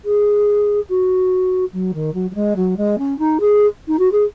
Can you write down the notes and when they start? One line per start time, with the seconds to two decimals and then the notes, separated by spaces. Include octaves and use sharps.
0.05 G#4
0.89 F#4
1.73 F#3
1.94 D#3
2.14 F#3
2.31 F#3
2.35 G#3
2.56 F#3
2.77 G#3
2.98 C#4
3.19 D#4
3.40 G#4
3.88 D#4
3.99 F#4
4.12 G#4